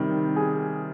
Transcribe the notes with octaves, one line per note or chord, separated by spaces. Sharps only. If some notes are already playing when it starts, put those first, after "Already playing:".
Already playing: C3 D#3 G3
G#4